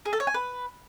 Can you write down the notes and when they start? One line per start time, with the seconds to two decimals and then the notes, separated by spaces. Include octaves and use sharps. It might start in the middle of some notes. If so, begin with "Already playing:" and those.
0.05 G#4
0.13 A4
0.20 C#5
0.27 G#5
0.34 B4